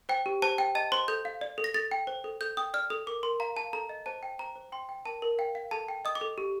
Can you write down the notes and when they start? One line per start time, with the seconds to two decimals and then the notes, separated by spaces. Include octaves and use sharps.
0.09 C5 G5
0.26 G4
0.42 C5 A5
0.58 G5
0.75 D#5 A5
0.92 C5 C6
1.08 A4 G6
1.25 F5
1.41 D5
1.58 A4
1.64 A#6
1.74 A4 A6
1.91 G5
2.07 C5
2.24 A4
2.41 A4 G6
2.57 G5 D#6
2.74 D5 F6
2.90 A4 D#6
3.07 A#4 D6
3.23 A#4 C6
3.40 F5 A#5
3.56 F5 A5
3.73 A4 A#5
3.89 D#5
4.06 C5 A5
4.23 G5
4.39 C5 A#5
4.56 C5
4.72 G5 C6
4.89 G5
5.05 A#4 A5
5.22 A#4
5.38 F5 G5
5.55 F5
5.71 A4 A5
5.88 G5
6.05 D#5 D#6
6.15 D6
6.21 A4
6.38 G4